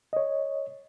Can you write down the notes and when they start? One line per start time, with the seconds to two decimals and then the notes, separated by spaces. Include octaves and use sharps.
0.13 C#5 D#5